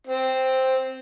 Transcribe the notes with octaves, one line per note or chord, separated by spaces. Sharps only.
C4